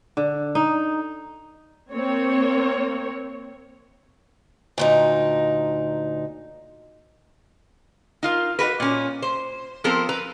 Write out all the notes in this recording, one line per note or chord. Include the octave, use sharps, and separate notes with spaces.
D3
D#4
A#3 C4 C#5
D2 A#2 D#4
D#4 F4 A#4
D#4 F#4 A#4 B4
A#2 C#4
C5
F3 B3 C4 A4 A#4 C5
B4 A#5